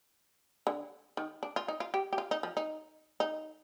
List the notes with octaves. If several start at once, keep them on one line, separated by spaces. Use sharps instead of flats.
D3
D#3
D4
F4
D#4
F4
G4
G4
F4
D#4
F3
D#4
D#4